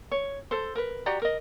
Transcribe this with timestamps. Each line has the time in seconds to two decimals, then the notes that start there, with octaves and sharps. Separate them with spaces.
0.11 C#5
0.51 A4 C5
0.75 A#4 B4
1.06 F#4 G4 D5 A#5
1.22 A#4 D#5